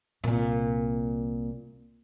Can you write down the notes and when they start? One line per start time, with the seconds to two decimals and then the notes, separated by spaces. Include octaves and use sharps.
0.24 C2 A#2